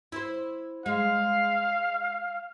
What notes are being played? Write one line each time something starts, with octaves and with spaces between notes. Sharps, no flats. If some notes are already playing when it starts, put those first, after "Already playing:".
E4 C5
G#3 F5